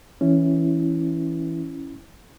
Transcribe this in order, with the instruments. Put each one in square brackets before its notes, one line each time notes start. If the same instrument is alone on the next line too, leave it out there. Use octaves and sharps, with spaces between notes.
[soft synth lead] E3 [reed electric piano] C#4 E4